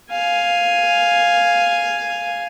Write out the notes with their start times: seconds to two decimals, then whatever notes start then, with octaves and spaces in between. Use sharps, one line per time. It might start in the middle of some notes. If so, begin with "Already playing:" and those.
0.11 F5 G#5